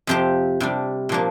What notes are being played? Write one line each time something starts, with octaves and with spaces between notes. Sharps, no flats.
F2 C3 F3 G4 C5
C3 G3 D4
A#2 F3 A#3 D4